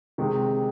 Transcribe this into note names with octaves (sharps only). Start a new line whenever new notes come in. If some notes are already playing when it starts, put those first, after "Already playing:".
C3 D#3 G#3